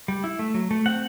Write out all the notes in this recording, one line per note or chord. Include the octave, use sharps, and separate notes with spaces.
G3
E4
A3
F#3
A3
C4 F#5